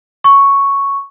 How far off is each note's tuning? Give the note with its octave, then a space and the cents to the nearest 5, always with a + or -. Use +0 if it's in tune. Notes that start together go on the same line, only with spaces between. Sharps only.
C#6 +0